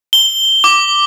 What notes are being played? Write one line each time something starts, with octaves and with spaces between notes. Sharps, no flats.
G7
D6